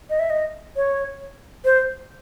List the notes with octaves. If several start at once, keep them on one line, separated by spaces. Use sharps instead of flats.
D#5
E5
D#5
C#5
C5